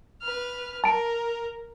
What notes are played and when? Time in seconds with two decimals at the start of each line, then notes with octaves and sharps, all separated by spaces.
0.22 B4 F6
0.84 A#4 A5 D7